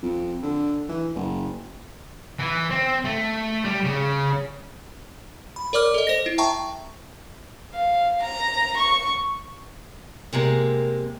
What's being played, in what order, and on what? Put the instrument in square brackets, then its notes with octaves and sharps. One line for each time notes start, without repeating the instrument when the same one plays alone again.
[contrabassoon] F2
D3
E3
F#1
[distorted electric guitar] E3
C4
A3
G3
C#3
[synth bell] B5
A#4 C#5 D5 D6 F6
A4 D#5
C5 A#6
E4
E5 G5 A5 A#5 C#6
[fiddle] F5
A#5
C#6
[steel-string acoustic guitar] C3 G#3 A#3 A#4